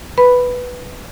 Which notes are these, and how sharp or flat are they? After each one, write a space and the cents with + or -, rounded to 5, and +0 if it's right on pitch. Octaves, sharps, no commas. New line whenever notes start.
B4 +0 B5 +0